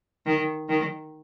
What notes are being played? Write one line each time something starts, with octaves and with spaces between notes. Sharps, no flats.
D#3
D#3